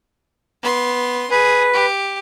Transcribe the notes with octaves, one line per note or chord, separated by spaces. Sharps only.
B3 C6
G#4 B4
G4